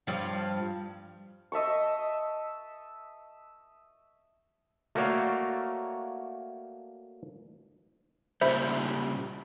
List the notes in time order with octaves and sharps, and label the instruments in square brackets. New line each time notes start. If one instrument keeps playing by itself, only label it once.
[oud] G2 F3
[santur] D#5 E5 A5 C#6
[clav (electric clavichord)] A3 A#3 F#4 C#5 D5 F5
[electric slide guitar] A#2 C#3 G3 [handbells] C5 E5 B5